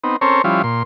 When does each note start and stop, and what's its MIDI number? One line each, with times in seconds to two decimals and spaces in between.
0.04 0.16 59
0.04 0.16 60
0.04 0.16 63
0.21 0.42 60
0.21 0.42 61
0.21 0.42 69
0.21 0.42 70
0.21 0.42 72
0.21 0.42 73
0.44 0.62 53
0.44 0.62 55
0.44 0.62 61
0.44 0.62 64
0.44 0.62 65
0.64 0.83 46
0.64 0.83 84